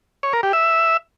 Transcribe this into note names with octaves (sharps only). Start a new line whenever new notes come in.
C#5
A#4
G4
E5